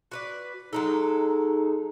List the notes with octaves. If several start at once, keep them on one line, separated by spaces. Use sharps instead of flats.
F#4 B4 D5
F#3 G#3 D#4 A4